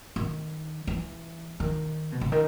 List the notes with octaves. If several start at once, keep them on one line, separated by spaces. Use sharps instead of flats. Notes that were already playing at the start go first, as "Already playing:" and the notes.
D#3
E3
D#3
B2
C#3
D#3